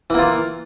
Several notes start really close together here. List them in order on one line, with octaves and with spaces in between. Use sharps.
E3 A#3 F4